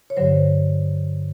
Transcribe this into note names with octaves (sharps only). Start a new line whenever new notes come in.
C#5
G2 D3 F#3 C5